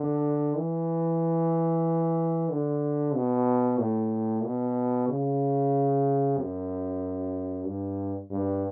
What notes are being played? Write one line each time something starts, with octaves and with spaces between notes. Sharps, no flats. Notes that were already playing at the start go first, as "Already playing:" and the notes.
Already playing: D3
E3
D3
B2
A2
B2
C#3
F#2
G2
G2